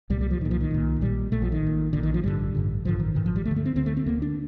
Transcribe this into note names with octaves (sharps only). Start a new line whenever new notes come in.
C2 A#2 G3
G3
F3
C2 A#2 D#3
F3
D#3
C2 A#2
A#1 A#2 G3
A#1 A#2 A3
F3
D#3
A#1 A#2
A#1 A#2 D3
D#3
F3
A1 G2 D3 G3
A1 G2 D3
A1 G2 D3 F3
D#3
A1 G2 D3 D#3
F3
G3
D2 A3
D3
A3
C4
D2 D3 C4
A3
C4
D2 D3 A#3
D4